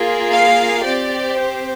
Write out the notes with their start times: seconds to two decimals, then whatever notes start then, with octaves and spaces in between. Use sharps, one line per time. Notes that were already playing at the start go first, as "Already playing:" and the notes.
Already playing: A#3 F4 G#4
0.31 F5
0.83 C4 G4 D5
1.37 C5